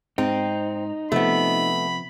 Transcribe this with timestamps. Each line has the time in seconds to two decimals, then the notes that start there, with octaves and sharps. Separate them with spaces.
0.18 G#2 C4 D#4
1.12 C3 F3 A3 B3 B5